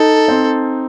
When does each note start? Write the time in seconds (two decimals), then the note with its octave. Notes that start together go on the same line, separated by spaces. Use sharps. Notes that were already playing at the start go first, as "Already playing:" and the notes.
Already playing: D#4 A4
0.28 C4